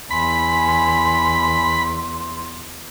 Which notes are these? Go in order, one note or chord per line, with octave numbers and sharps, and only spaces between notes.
E2 G#5 B5 C6